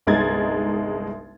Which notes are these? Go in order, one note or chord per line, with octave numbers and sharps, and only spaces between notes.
G1 C2 G#3 D#4 G#6 A6